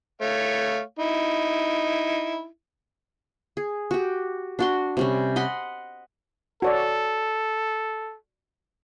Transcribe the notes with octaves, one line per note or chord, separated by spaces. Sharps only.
A3 C#5 F5
D#4 E4
G#4
F#4 G4
D4 F#4 C6
C3 G3 C#4
D#5 F#5 B5 C6
F#4 A4 C#5 D5